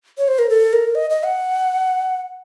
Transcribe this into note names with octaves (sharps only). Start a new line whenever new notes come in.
C#5
C5
A#4
A4
A#4
D#5
D#5
F#5